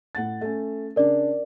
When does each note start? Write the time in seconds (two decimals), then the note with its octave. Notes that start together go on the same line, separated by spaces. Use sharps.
0.15 A2 F#5 A6
0.41 A3 C#4
0.96 C#3 D4 A#4 D5